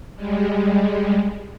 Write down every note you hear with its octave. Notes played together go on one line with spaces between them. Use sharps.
G3 G#3